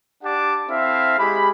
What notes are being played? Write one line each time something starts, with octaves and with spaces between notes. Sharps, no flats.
D4 G4 F#5 A5 D6
C4 E4 A4 E5 F5
G#3 G4 B5